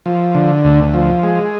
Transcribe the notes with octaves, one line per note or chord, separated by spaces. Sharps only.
F3
D3
D2
F3
G#3